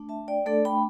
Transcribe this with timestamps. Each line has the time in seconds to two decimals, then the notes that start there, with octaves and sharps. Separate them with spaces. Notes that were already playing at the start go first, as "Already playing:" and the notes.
Already playing: A3 D4
0.09 E5 A5
0.28 D5 G5
0.46 A3 D4 A4 D5
0.65 G5 B5